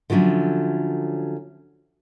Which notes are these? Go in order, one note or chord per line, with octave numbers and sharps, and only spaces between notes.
D3 F3 F#3 A3 C#4